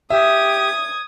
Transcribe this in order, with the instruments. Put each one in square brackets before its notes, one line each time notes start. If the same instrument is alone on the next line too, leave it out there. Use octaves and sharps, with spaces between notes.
[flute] G4 [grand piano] E5 [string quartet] D#6 G#6